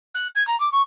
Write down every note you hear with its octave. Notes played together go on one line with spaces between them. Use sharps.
F#6
G#6
A#5
D6
C#6